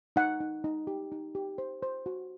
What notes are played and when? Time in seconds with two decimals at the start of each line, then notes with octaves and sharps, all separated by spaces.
0.16 D#4 F#5
0.40 D#4
0.64 D#4
0.87 G4
1.12 D#4
1.35 G4
1.58 C5
1.83 C5
2.06 F#4